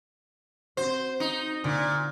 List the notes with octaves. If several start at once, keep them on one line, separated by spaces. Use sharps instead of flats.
C4 F#4 C5
D#4
A#2 D3 F#6